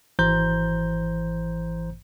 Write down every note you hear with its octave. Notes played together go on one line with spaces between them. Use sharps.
G#1 E3 C5 A#5 G6